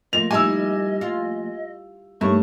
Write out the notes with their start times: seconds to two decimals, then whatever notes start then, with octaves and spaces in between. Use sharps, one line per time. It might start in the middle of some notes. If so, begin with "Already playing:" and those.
0.13 F3 A3 A#3 C4 D#5 F7
0.31 G3 D#4 E4 G#5 E6
1.01 F4
2.21 G2 A3 A#3 D#4 C#5 C#6